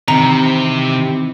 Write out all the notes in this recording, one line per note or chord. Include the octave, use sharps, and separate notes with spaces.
C3 D#3 E3 C4 A#5